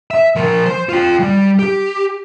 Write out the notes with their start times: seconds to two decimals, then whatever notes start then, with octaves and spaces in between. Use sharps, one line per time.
0.11 E5
0.36 F3 A#4
0.66 C5
0.89 F4 G5
1.19 G3
1.59 G4